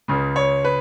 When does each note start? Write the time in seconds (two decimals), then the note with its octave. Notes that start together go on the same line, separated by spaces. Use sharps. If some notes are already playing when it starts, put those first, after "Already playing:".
0.08 C#2 C#3
0.36 C#5
0.64 B4